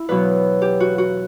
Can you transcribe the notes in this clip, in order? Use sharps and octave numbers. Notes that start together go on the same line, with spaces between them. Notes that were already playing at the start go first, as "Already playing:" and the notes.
Already playing: E4
E2 B2 F#3 B4
G4
F#4
F#4